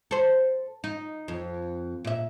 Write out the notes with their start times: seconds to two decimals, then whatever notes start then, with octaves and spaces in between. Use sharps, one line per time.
0.11 A4 C5
0.84 D#4
1.28 F2
2.05 A#2 E5